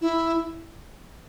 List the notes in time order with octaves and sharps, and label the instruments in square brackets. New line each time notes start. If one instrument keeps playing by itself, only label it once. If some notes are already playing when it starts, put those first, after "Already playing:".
[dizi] E4